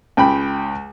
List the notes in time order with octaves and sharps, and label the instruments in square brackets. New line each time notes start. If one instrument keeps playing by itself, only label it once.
[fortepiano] C#2 G5 B5